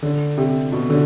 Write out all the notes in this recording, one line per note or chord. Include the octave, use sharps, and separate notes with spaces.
D3
C3
B2
D3